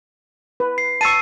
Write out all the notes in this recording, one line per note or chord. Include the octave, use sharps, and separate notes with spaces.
B4
C7
A5 C#6 E6 C7 D#7